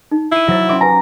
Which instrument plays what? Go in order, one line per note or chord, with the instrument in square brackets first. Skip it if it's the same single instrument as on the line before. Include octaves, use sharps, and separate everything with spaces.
[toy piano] D#4
[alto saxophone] E4 [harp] C7 D#7
[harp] F#3 A6 [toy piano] C5 E5
[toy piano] C#4 E5 C6 [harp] D6
[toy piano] G4 B4 G#5 [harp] A#5